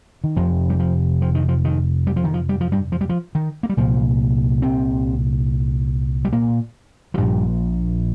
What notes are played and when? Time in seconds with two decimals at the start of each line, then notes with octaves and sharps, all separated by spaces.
0.24 D#3
0.36 F1 F2 C3 F3
0.70 G3
0.80 F3
1.22 F3
1.35 D#3
1.49 F3
1.65 D#3
2.07 G3
2.16 F3
2.24 D#3
2.34 F3
2.49 G3
2.61 F3
2.72 G2 G3
2.92 F3
3.01 G3
3.09 F3
3.35 D#3
3.63 A#3
3.70 G3
3.77 C2 A#2 F3
4.62 C3 C4
6.25 G3
6.33 A#2 A#3
7.14 F3
7.18 A#1 G2 A#2 G3